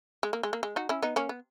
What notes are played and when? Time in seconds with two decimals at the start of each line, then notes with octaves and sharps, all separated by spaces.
0.23 G#3
0.33 A#3
0.43 G#3
0.53 A#3
0.63 G#3
0.76 D#4 F#4
0.89 C#4 E4
1.02 B3 D#4
1.16 A#3 C#4
1.29 B3